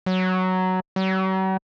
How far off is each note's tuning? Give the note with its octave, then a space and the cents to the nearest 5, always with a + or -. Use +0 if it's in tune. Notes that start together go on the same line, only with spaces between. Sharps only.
F#3 +5
F#3 +45